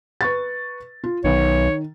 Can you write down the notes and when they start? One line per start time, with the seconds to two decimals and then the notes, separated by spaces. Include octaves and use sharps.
0.21 B4 C#6 A6
1.04 F4
1.24 B1 D#3 C#5